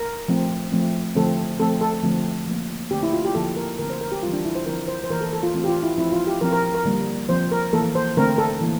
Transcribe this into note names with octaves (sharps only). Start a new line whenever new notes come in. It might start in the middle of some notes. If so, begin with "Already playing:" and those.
Already playing: A#4
F3 A3 C4
F3 A3 C4
D3 F3 A3 C4 A4
F3 A3 C4 A4
A4
D3 F3 A3 C4
F3 A#3
D3 A3 C4 G4
E4
F4
G4
D3 F3 A#3 A4
A#4
D3 A3 C4 A#4
C5
A#4
G4
E3 G3 C4 F4
D4
E4
C5
D3 F3 C4 A#4
C5
C5
E3 A#3 A#4
A4
A4
F4
E3 A3 C4
G4
F4
E4
F3 C4 E4
F4
G4
F3 C4 A#4
A#4
A#4
D3 G3 A#3
F3 C4 C5
A#4
E3 A#3 A4
C5
D3 A3 C4 A#4
A4
E3 A#3